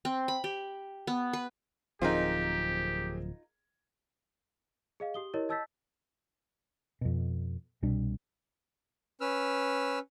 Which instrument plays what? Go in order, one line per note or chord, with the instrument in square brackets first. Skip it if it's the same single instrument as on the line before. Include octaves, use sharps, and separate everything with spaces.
[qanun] C4
B5
G4
B3
B4
[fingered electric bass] D1 F3 [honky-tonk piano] C4 G#4 A#4 [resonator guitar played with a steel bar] D#4 F4 [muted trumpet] G4
[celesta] G#4 D#5 F5
G4 D#6 G7
E4 G4 A#4 C#5 D#5
D#5 A5 E6 G6 A6 B6
[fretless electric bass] F2 B2
C2 B2 G3 D4
[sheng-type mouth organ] C#4 B4 E6 F6